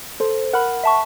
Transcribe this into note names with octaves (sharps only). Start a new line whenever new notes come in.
A4 C5
A#4 F#5 B5
E5 A5 C#6